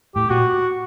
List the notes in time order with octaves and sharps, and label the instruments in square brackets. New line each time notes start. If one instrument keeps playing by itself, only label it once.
[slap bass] A2 [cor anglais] G4
[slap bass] A#2 [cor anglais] F#4